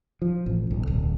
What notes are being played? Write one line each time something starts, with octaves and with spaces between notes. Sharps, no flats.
F3
A1
B1
D1